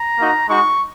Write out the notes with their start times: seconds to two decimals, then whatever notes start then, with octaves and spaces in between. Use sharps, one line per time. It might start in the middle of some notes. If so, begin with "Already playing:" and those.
Already playing: A#5
0.19 A#3 D#4 F#4
0.49 G#3 D#4 F#4 C#6